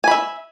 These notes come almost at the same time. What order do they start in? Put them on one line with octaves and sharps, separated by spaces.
G#5 B5 E5